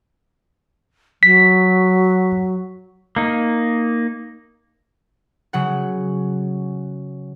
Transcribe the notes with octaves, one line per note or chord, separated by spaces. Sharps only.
F#3 B6
A#3 D#4
C#3 F#3 F#5